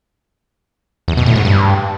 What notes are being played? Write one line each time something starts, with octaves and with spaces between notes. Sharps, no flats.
E2
B2
A2
G#2
G2